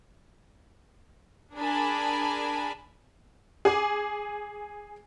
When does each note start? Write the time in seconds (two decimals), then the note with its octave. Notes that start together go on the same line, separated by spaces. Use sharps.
1.55 D4 G#4 A#4 G#5 A5 B5
3.65 G#4 G#5 D6